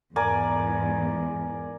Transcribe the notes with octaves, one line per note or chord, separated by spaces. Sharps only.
E2 G#2 A#4 D5 G#5